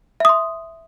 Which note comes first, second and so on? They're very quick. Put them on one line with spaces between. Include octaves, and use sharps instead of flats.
E5 D#6 C6